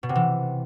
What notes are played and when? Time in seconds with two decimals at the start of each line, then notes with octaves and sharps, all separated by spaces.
0.03 B2
0.09 C3
0.16 E3